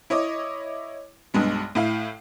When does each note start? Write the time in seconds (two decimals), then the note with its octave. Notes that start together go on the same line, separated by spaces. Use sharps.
0.10 E4 C#5 D#5 D6
1.34 B1 G2 G#3 B3
1.75 A2 E4 F5 C7